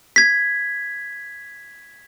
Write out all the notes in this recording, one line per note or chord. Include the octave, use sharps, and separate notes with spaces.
G#6 B6